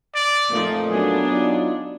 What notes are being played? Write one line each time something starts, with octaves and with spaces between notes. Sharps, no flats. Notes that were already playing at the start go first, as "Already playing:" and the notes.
D5
F2 A#2 F3 A3 D#4
F#3 B3 D4 G#4
D#4 F4 D5